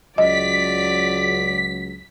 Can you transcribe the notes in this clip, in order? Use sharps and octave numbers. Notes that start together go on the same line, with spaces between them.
C#2 F#3 D5 D#5 B6